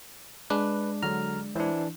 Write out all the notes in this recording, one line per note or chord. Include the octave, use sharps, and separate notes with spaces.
G#3 D4 B4
D3 F#3 A#5 F6
E3 D4 E4 C5